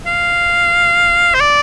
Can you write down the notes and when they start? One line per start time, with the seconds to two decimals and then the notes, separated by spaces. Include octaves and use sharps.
0.06 F5
1.34 C5
1.40 D5